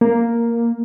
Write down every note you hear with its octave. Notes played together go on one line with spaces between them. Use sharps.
A#3